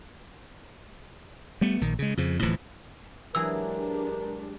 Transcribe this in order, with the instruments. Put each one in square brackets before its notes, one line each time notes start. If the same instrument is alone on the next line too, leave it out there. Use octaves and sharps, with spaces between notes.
[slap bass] G3 A3 B3
A#1 D#3
C#3 G#3
F2 C#3 F3
D1 A2 E3 F3
[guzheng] E3 F#3 G#4 [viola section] G#3 D4 G4 [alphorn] A#4 [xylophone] E6